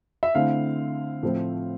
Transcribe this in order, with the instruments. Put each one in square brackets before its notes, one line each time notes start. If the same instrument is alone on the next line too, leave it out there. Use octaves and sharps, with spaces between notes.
[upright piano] E5
D3 A3 C4 E4 F5
A2 F3 A3 C4